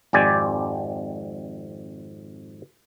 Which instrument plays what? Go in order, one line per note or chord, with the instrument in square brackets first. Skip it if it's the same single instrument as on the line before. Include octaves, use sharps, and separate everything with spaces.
[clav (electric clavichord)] G#1 F2 G4 D5 G#5